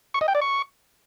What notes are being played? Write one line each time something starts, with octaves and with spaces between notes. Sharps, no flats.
C#6
D#5
G5
D5
C#6